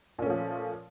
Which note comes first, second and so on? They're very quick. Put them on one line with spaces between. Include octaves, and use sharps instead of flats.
A#2 C#4 A3 F3